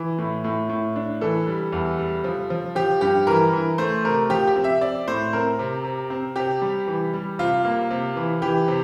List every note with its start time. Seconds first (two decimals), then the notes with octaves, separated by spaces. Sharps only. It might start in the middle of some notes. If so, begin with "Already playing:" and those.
Already playing: E3
0.18 A2
0.44 A2
0.69 A2
0.96 D4
1.21 E3 A4
1.47 G3
1.72 E2
1.98 G3
2.24 F3
2.50 F3
2.75 F3 G4
3.01 G2 G4
3.27 E3 A#4
3.53 E3
3.78 A3 C5
4.04 C3 A#4
4.30 F3 G4
4.47 G4
4.56 C4
4.64 E5
4.81 C4 D5
5.08 A2 C5
5.33 C4 A#4
5.59 C3
5.84 C3
6.10 C4
6.36 C3 G4
6.62 G3
6.87 E3
7.13 G3
7.39 C3 F4
7.65 A#3
7.90 C3
8.16 E3
8.42 E3 G4
8.68 C3